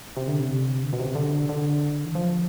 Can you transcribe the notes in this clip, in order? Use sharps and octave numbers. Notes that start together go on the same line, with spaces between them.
C3
D3
C3
D3
B2
C3
D3
D3
E3
F3